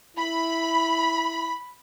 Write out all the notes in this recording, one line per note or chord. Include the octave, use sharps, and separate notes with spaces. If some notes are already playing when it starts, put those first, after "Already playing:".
E4 B5